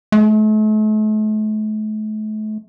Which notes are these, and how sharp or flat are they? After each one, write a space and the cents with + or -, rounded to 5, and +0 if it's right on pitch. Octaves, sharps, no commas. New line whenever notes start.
A3 -40